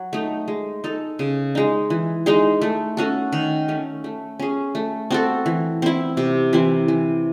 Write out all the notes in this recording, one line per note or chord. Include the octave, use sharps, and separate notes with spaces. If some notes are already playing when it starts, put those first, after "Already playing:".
Already playing: F#3
A3 D#4
G#3
D#4 A4
C#3
G#3 D#4
E3
G#3 D#4 G#4
A3
C#4 F#4 A4
D#3
A3 C#4
A3
C#4 G#4
A3
C4 F#4 A4
E3
C4 E4
C3
E3 C4 E4
E3